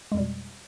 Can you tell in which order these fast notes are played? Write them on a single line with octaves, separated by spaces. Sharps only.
G#3 F2 G3 B2